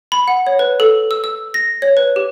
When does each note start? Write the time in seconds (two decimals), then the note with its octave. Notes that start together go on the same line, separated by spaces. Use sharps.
0.12 B5
0.28 F#5
0.47 C#5
0.59 B4
0.80 A4
1.11 E6
1.24 E6
1.54 A#6
1.82 C#5
1.97 B4
2.16 G4